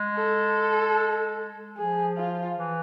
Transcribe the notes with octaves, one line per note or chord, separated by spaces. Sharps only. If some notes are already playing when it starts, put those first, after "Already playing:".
Already playing: G#3
A4
F3 G#4
F4
E3